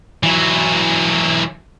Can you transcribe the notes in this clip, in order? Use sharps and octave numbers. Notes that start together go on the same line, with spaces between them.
E3 F#3